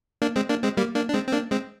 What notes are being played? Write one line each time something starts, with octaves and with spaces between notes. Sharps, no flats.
A#3 D4
G#3 C4
A#3 D4
G#3 C4
G3 A#3
A#3 D4
D4
G#3 C4
C4
A#3 D4
G#3 C4